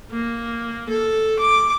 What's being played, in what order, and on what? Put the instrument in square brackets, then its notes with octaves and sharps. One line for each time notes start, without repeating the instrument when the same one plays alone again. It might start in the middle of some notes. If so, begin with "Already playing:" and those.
[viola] A#3
A4
D6